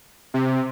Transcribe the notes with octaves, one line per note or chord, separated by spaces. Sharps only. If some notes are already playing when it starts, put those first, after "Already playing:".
C3